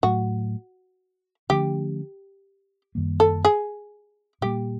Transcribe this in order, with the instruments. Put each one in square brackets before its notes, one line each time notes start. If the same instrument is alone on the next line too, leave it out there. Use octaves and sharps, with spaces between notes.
[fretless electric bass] A2 F#3 A3 [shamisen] F#4
[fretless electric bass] D3 F3 A3 C#4 [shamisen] G4
[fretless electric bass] F#2 D#3 G3 A#3
[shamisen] A4
G#4
[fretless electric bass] A#2 G3 A#3 [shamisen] G4